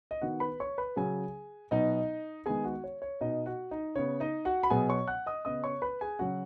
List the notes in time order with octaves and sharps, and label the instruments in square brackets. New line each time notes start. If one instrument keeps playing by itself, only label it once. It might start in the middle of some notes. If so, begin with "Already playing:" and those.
[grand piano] D#5
D#3 B3 F#4 F#5
B4 B5
C#5 C#6
B4 B5
C#3 F#3 C#4 G#4 G#5
B2 F#3 B3 D#4 D#5
D#3 G#3 B3 G#4 G#5
F#4 F#5
C#5
C#5
B2 B3 D#4 D#5
F#4 F#5
D#4 D#5
C#3 B3 C#5
D#4 D#5
F#4 F#5
B5
B2 F#3 B3 G#4 G#5
C#5 C#6
F#5 F#6
D#5 D#6
C#3 B3 D#5 D#6
C#5 C#6
B4 B5
G#4 G#5
C#3 F#3 C#4 F#4 F#5